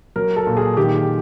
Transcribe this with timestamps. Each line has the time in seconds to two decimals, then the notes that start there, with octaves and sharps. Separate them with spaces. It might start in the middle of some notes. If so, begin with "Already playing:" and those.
0.16 F#3 A#4
0.36 A4
0.47 A#2
0.57 G#4
0.77 D#3 G4